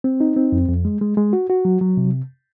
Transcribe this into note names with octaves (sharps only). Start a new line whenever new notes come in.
C4
D#4
C4
F2
F2
G#3
G#3
G#3
F#4
F#4
F#3
F#3
C3